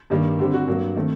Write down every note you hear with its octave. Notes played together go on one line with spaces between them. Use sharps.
G2 D#3 G3 A#3
D3 G3 C4 G4
F#4
G2 F#3 A#3
D#3 A3 C4